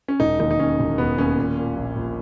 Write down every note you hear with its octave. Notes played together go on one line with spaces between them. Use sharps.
C#4
E1 D#4
D#2 D#4
D#4
D#3 C#4
E1
E1 B3
D#2 C#4
A#2
A#2
A#1
A#1